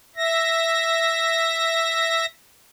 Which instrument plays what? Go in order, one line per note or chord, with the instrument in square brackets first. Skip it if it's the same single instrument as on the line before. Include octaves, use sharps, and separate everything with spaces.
[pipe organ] E5 A#6